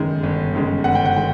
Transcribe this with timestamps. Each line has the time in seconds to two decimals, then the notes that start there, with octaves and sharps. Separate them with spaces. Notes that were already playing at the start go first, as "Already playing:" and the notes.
Already playing: G1 F#2 D#3 G#3
0.23 G1
0.54 F#2 D#3 G#3
0.84 G1 F#5
0.95 G5
1.05 F#5
1.16 D#3 G#3 G5